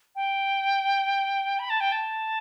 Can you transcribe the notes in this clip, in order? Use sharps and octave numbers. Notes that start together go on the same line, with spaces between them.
G5
B5
A5
G5
A5